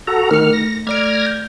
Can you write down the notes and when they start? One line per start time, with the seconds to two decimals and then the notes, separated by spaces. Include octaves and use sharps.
0.07 F#4 A4 A#5
0.31 D#3 A3 F6 C#7
0.53 A#6
0.87 A3 D5 F6 G#6 A#6 D7
1.27 G6